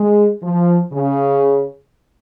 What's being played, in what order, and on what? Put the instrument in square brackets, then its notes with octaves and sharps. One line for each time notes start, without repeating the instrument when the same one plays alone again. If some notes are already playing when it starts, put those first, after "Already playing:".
Already playing: [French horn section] G#3
F3
C#3